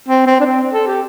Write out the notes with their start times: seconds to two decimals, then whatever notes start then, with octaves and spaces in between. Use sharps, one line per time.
0.08 C4
0.27 C4
0.40 D4
0.45 C4
0.73 A4
0.87 G4